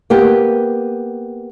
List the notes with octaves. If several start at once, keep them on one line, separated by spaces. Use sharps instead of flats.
A#3 B3 G4